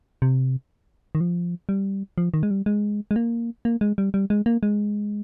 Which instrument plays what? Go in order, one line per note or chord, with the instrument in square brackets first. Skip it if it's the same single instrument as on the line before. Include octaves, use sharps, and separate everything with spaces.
[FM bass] C3
D#3
F3
G3
F3
D#3
G#3
G3
G#3
G#3
A#3
A#3
G#3
G3
G3
G#3
A#3
G#3